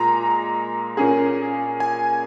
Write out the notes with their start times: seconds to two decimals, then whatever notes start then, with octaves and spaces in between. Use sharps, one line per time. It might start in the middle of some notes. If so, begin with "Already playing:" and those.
Already playing: A#2 G#3 A#5
0.97 A#2 A#3 C#4 G#4
1.80 G#5